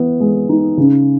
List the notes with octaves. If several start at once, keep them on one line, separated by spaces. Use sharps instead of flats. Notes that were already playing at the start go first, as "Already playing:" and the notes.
Already playing: E3 B3
G#3
D#4
C#3